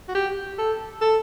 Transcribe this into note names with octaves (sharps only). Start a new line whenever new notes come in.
F#4
G4
A4
A4